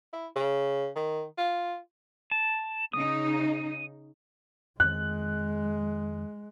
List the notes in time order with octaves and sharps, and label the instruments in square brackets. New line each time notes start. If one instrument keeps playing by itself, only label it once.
[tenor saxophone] E4
C#3
D#3
F4
[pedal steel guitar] A5
[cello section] C#3 D#4 [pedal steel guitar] D#6
[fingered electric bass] F2 D#3 [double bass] G#3 [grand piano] F#6